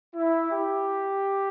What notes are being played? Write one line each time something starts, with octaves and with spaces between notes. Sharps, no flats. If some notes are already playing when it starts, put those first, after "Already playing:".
E4
G4